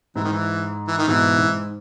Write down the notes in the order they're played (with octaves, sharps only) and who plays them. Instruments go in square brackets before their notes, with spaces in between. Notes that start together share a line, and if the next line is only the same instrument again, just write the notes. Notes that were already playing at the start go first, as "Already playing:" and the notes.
[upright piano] G#2 [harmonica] E3
[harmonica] D#3
E3
E3
D#3
[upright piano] G#2 B2 [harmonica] E3
[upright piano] G#2